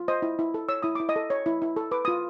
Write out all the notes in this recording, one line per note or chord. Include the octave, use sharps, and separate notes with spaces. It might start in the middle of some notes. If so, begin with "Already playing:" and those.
Already playing: F4
C5 D#5 D#6
E4
E4
A4
C#5 E6
E4 D#6
E4 D6
D#5 D#6
A4
C#5
E4
E4
A4
B4 D6
F4 D#6